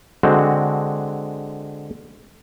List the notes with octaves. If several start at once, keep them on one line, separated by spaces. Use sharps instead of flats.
D3 G#3 C4 F#4